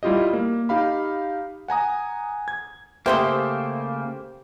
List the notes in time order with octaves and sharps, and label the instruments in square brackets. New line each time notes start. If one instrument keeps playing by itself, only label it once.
[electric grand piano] G3 E4 F4 G4 D#5
A#3
D#4 G4 F5 B5
F#5 G#5 A#5 D#6
G#6
[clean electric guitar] C#3 A3 A#3 [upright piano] G4 C5 [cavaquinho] E5 C6 D#6